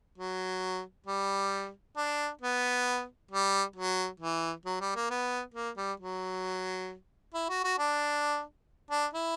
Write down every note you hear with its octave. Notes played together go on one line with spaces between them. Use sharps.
F#3
G3
D4
B3
G3
F#3
E3
F#3
G3
A#3
B3
A#3
G3
F#3
E4
F#4
F#4
D4
D4
E4